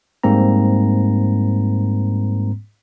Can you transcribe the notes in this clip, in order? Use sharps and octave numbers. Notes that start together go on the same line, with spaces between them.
G#2 G3 A#3 C4 A#5